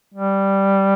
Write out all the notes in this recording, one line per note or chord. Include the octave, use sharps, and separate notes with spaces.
G3